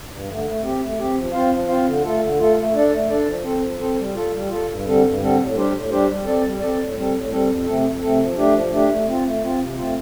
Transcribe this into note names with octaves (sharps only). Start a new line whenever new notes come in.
G2
D3 A3
A3
C4 G4
A3
C4 G4
F3
C4 F4 C5 F5
F3
C4 F4 C5 F5
D3
A3 F4 A4
D3
A3 F4 A4
A3
D4 A4 D5
A3
D4 A4 D5
F3
C4 A4 C5
F3
C4 A4 C5
G3
F4 A4
G3
F4 A4
G2
D3 G3 C4 A4
G2
D3 G3 C4 A4
A2
G3 D4 G4 C5
A2
G3 D4 G4 C5
G3
C4 A4 D5
G3
C4 A4 D5
A2
G3 C4 A4
A2
G3 C4 A4
F2
C3 A3 C4 A4
F2
C3 A3 C4 A4
F3
A3 D4 G4
F3
A3 D4 G4
A3
C4 F4
A3
C4 F4
C3
A3 C4 F4